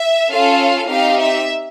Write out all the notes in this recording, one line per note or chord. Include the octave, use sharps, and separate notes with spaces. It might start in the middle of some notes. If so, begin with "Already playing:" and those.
Already playing: E5
C#4 F4 A4 F5
C4 D#4 G4 F5
E5